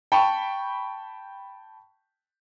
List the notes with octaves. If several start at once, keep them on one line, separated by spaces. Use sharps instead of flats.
G5 A5 B5 C#6